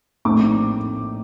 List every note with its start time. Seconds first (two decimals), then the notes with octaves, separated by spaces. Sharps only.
0.25 A#1 A2 A3 C4 D#4 D6